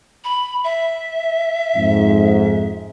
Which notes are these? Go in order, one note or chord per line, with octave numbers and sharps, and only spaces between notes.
B5
E5
F2 G#2